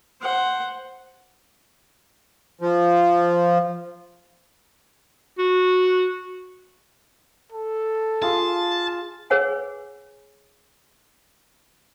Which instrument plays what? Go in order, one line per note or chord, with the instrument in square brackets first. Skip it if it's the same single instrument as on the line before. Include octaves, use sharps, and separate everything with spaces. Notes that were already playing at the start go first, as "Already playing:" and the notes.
[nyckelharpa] C5 F#5
[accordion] F3
[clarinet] F#4
[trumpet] A4
[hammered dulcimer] F4 G#4 [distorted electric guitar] A5
[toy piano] G#4 B4 C#5 F#5 G#5